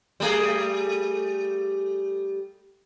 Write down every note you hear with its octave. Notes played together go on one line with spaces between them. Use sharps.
G3 A3 G#4